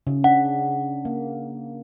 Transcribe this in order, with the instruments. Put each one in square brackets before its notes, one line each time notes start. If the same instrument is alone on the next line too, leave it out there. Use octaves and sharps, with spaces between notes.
[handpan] C#3
[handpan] D4 [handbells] F#5
[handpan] A#3